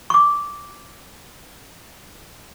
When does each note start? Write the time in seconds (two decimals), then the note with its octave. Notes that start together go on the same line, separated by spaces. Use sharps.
0.10 C#6 D6